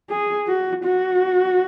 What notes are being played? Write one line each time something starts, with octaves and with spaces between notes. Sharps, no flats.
G#4
F#4
F#4